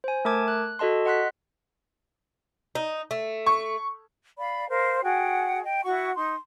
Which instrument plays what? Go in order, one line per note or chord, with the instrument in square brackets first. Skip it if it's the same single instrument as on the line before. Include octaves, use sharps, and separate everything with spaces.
[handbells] C5 G#5
A3 A#4 A5 D6 G#6
F#6
F#4 A4 D#5 A5 C6
D#5 F#5 C6 F#6 B6
[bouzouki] D#4
A3
[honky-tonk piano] C#6
[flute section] D5 F5 B5
A#4 C5 F5
F#4 G#4 F#5 G5
D#5 G5
E4 F#4 F#5 C#6
D#4 C6